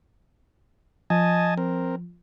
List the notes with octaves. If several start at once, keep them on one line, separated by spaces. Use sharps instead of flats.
F3 D#5 G#5 A5
C4 A#4